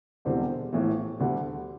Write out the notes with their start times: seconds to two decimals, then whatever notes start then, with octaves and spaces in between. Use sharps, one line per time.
0.25 E1 E2 D3 G3 C4
0.73 A#1 A2 E3
1.19 D2 D3 G3